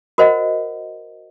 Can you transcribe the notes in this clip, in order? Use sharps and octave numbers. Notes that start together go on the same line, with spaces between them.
F#4 A#4 C5 D#5 F#5